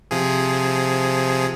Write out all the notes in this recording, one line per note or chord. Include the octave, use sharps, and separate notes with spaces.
C3 F3 G#4